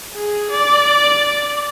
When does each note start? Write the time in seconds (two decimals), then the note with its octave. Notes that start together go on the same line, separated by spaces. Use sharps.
0.15 G#4
0.50 D5